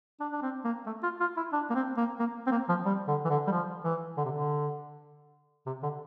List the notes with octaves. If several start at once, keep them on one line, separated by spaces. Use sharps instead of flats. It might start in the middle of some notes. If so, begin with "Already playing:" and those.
D4
D4
C4
A#3
A3
F4
F4
E4
D4
A#3
C4
A#3
A#3
C4
A#3
F3
G3
D3
E3
D3
G3
F3
E3
D3
C3
D3
C3
D3